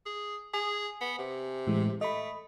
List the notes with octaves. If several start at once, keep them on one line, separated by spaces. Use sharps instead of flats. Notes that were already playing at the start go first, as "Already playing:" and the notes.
G#4
G#4 G#5
B3
C3
A2 E3 G#3
A3 D#5 B5